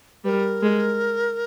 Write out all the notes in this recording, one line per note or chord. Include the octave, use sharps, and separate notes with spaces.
G3 A#4 B4
G#3